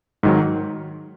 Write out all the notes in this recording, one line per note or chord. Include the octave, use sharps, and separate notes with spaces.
G#2 D#3 F#3